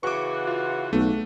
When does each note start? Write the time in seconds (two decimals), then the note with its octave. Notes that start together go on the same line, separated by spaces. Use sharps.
0.03 C#3 E3 F#4 B4 C#6 D6
0.47 F4
0.93 B1 A3